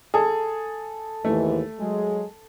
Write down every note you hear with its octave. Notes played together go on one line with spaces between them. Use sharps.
G#4 A4
D#2 G#2 E3 A3
F#3 G#3